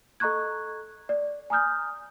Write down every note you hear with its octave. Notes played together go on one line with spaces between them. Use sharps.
A4 D#5 A#5 C#6 F#6 G#6
D5
G#5 A#5 D#6 F6 G6